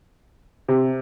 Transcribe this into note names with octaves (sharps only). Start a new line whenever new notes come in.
C3